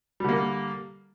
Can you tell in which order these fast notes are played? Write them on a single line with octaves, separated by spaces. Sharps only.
G3 D3 A#3